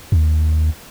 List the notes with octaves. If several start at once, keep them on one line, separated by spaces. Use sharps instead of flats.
D#2